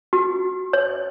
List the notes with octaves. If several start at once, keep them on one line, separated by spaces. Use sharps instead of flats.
F#4
C#5